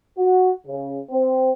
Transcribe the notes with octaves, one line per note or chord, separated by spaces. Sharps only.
F#4
C#3
C4